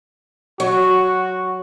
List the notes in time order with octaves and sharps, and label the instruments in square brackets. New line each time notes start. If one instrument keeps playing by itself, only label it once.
[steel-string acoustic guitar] F#3 [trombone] F#4